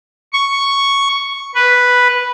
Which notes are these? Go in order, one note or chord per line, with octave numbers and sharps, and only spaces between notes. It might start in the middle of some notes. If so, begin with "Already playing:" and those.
C#6
B4